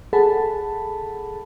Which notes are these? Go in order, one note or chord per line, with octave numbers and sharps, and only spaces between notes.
G#4 A4 F#5 A5 B5